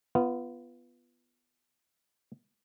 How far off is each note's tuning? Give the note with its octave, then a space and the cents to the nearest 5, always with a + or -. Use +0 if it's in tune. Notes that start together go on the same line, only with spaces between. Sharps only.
B3 +0 F4 -25